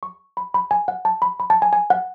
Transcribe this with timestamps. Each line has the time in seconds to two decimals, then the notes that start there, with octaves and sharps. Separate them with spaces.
0.03 C#6
0.37 B5
0.54 B5
0.71 G#5
0.88 F#5
1.05 A5
1.22 B5
1.40 B5
1.50 A5
1.62 G#5
1.73 G#5
1.90 F#5